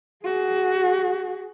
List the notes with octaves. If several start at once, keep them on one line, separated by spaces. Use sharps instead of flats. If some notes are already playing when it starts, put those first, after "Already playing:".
F#4 G#4